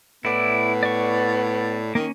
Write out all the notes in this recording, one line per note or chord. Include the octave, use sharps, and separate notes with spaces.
A2 B3 E4 D5
D5 C#6
D#3 A#3 C#4